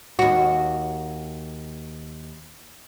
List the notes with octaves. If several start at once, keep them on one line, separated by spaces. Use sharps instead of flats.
D#2 F#4